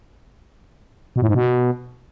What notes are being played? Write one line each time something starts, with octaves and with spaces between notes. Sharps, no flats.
B2
A2
G#2
B2